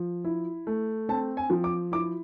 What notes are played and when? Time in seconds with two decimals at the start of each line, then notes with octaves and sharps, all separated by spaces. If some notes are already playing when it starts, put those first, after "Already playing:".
Already playing: F3
0.25 E4
0.67 A3
1.09 C4 A5
1.37 G#5
1.50 F3
1.64 D6
1.92 E4 D6